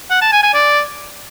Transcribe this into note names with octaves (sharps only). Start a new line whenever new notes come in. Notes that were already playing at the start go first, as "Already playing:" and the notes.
F#5
A5
G#5
G#5
D5